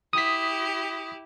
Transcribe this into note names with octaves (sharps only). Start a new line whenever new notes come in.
E4 G4 D#6 B6